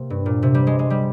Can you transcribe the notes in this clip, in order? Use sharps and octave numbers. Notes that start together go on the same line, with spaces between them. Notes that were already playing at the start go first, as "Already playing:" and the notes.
Already playing: C3 A#3
G2
A#2
C3
G3
G#3
G#3
G3